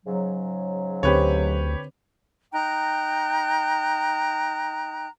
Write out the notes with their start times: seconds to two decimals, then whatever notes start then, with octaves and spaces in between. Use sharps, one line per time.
0.05 G#2 C#3 F#3
1.03 D2 D3 C4 G4 B4 C#5
2.53 D#4 G5 A#5 F#6